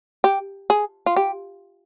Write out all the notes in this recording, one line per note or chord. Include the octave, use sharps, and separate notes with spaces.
G4
G#4
F4
G4